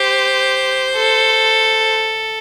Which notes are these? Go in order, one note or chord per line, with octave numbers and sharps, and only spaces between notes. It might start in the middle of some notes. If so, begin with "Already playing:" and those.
Already playing: G4 C5
A4